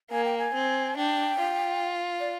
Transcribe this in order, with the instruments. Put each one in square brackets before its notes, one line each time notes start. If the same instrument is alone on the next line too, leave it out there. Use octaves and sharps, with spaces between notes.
[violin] A#3 [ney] G#5
[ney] G5
G#5
[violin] C4
[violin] D4 [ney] G5
[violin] F4
[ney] D5